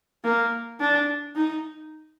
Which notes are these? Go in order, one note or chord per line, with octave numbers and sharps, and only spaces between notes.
A#3
D4
D#4